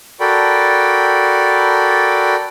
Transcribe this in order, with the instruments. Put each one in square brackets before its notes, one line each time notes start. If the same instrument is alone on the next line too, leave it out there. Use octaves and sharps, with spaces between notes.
[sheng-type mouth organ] F#4 A4 A#4 D5 G5 B5